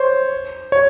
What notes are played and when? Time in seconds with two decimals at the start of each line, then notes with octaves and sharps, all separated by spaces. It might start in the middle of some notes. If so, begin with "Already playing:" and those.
Already playing: C5 C#5
0.72 C#5